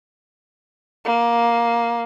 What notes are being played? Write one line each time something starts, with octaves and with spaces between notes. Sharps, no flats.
A#3